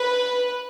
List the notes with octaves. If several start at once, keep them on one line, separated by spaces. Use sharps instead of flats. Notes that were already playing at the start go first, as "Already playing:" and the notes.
Already playing: B4